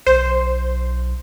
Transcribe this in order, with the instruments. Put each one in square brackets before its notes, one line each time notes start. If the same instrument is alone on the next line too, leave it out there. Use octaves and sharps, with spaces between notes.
[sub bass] B1 [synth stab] C5